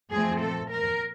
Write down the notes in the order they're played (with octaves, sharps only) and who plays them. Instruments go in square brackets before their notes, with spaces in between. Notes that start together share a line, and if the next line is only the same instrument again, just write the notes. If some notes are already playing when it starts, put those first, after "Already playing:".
[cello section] A#2 F3 A3 C4 G#4
A4
A#4